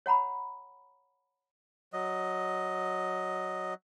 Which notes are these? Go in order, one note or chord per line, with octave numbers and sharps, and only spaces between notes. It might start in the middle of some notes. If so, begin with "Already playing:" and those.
C#5 F#5 A#5 B5
F#3 D#5